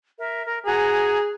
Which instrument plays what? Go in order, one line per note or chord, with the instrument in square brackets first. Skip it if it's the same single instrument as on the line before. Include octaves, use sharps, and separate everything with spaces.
[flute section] A#4 E5
A#4
[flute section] F#4 G#5 A#5 [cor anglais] G#4